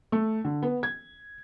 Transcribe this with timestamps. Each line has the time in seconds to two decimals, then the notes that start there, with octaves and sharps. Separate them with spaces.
0.12 A3
0.45 D3
0.63 B3
0.83 G#6